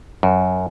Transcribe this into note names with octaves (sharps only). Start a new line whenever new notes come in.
F#2